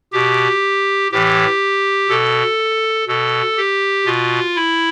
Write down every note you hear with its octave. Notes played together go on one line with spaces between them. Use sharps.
B2 G4
A2 E3 G4
B2 A4
B2 A4
G4
B2 F4
E4